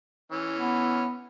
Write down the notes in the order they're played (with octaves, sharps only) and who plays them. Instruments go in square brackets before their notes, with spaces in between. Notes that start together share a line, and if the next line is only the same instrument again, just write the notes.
[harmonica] E3 C#4
[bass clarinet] B3